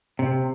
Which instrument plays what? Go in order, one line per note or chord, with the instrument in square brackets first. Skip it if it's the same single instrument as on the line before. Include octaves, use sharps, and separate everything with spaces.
[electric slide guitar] C3